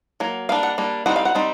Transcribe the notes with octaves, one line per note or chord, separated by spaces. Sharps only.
F#3 A#3
G3 A#3 D4 F5
F#5
G3 A#3 D4
G3 C4 D#4 F#5
F5
F#5
G3 C4 D#4